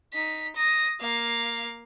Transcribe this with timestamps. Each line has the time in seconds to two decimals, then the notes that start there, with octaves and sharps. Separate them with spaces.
0.13 D#4 B6
0.56 D#6 A#6
1.00 A#3 F5